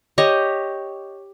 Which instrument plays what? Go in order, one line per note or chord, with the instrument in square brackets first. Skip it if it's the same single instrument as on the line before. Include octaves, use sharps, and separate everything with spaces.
[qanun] G4 C#5 D#5